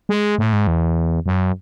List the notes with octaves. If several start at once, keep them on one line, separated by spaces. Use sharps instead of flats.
G#3
A2
G#2
E2
F#2